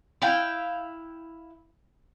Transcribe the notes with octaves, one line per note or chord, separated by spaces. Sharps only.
E4 E5 F5 G5